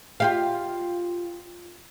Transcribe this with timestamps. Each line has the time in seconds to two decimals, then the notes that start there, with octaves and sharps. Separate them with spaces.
0.20 F4 G4 F5